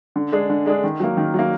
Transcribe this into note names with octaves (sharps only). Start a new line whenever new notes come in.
D3
G#3 D4 G#4
D3
G#3 D4 G#4
D#3
F#3 A#3
D#3
F#3 A#3